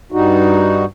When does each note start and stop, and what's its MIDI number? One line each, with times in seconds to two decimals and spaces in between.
0.12 0.85 43
0.12 0.85 55
0.12 0.85 63
0.12 0.85 66